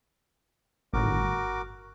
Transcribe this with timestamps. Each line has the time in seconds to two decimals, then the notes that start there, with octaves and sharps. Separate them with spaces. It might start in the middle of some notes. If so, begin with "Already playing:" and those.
0.93 G#1 A2 F#4 A#4 D6
1.06 G1